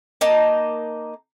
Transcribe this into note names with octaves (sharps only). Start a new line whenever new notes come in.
A#3 D#4 A5